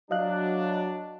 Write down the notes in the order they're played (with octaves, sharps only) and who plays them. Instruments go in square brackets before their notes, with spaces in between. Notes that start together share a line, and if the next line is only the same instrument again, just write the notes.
[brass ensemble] F#3 D4 [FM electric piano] D#5 F5 F#6